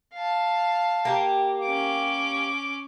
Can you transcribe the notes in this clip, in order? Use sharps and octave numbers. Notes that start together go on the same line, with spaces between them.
F5 A5
A#3 G4
C#4 D6